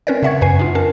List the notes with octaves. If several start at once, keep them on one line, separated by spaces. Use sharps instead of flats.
C4 C#4 A#4 B4 C#5 D5
C#3 C4 E5 F#5 C#6 G#6
F#2 B4 G#5 C7
D4 D#4 F4
C#4 A#4 A5 C7